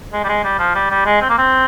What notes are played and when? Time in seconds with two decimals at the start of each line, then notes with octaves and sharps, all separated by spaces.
0.13 G#3
0.24 G3
0.29 G#3
0.44 G3
0.59 F3
0.75 G3
0.91 G3
1.05 G#3
1.21 C4
1.29 A#3
1.38 C4